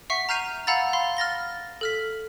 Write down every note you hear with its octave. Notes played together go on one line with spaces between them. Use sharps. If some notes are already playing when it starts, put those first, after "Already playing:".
E5 F#5 C#6 B6 C7
A#5 F6 G6 C7 D#7 F7
F5 F#5 A#5 B5 E6 A6
F5 B5 C6
F6 A6 A#6 G7
A4 F6 B6